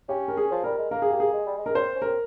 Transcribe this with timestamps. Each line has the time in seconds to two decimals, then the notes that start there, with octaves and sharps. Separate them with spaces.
0.09 C#4 G4
0.28 A#4
0.37 G#4
0.51 F3
0.64 G3 A#4
0.78 G#3
0.91 A#3 A#4
1.02 G#4
1.11 G4
1.20 G#4
1.33 G#3
1.46 G3
1.58 G#3
1.66 A#4
1.75 C4 C5
1.95 C#4
2.02 C4 A#4